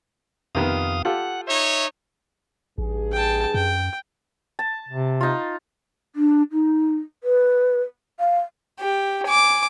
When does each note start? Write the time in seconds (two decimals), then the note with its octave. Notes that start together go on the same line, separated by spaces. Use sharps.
0.55 F2 C3 D#3 B3 F5 D#6
1.05 F4 G4 A4 F#5
1.48 D#4 C#5 E5
2.78 A1 G2 G#4
3.12 G5 A5
3.54 F#2 G5
4.59 A5
4.88 C3
5.21 D#4 F4
6.16 D4
6.52 D#4
7.24 B4
8.20 F5
8.80 G4
9.27 G#5 D6